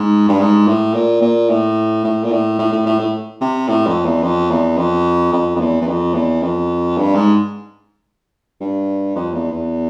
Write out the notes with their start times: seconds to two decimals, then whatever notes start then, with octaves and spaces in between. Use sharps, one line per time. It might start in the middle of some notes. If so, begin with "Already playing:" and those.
Already playing: G#2
0.28 G2
0.40 G#2
0.67 A2
0.94 A#2
1.21 A#2
1.49 A2
2.04 A2
2.24 A#2
2.31 A2
2.59 A2
2.72 A2
2.86 A2
2.99 A2
3.41 C3
3.68 A2
3.86 F2
4.05 E2
4.23 F2
4.50 E2
4.77 F2
5.33 F2
5.56 F2
5.60 E2
5.81 E2
5.88 F2
6.14 E2
6.42 F2
6.97 G2
7.15 G#2
8.60 G2
9.15 F2
9.34 E2
9.52 E2